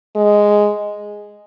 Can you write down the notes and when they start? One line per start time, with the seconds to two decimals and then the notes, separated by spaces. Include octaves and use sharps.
0.16 G#3